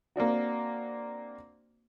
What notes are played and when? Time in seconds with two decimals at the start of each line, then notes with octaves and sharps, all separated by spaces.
0.16 A#3 C4 D4 F#4